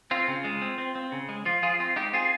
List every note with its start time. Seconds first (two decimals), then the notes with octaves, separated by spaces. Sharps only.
0.11 C4 F4
0.28 C#3
0.44 G#3
0.62 C4
0.78 C4
0.95 C4
1.12 C#3
1.29 G#3
1.45 F3 F4
1.63 F3 F4 G#4
1.80 C4 F4
1.96 G#3 D#4 G4
2.13 C4 F4 G#4